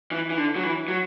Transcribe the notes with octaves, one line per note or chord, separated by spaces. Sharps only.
E3
E3
D3
F#3
E3
F#3